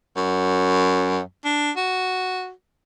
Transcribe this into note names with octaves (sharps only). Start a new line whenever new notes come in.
F#2
D4
F#4